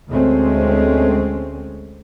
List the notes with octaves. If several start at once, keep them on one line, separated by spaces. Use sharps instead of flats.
D2 G#3 A3 C4 C#4